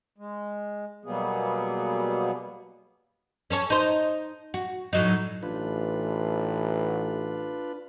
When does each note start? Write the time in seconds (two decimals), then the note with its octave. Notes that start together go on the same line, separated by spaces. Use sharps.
0.18 G#3
1.05 B2 F#3 G3 A#3 B3 G#4
3.50 C#4 A4 C#5
3.70 D#4 C5
4.54 F#4
4.93 A2 F#3 D#4
5.43 A1 D4 F4 B4